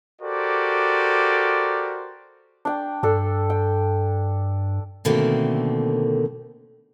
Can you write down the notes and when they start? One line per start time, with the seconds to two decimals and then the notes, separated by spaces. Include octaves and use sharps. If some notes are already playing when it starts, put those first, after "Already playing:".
0.22 F#4 G4 A4 A#4 C5 D5
2.65 D4 G5
3.03 G2 D4 A4
3.50 G5
5.05 B2 D3 D#3 A3 A#3 C4